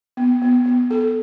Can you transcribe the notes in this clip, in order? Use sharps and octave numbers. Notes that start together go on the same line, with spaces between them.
B3
B3
B3
A4